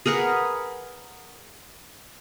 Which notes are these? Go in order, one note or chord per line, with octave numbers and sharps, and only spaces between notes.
G#4 A#4 B4 F#5